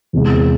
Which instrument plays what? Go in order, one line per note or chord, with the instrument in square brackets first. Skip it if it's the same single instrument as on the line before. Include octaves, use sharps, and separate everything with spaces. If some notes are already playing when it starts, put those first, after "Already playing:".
[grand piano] E2 C3 E3 G#3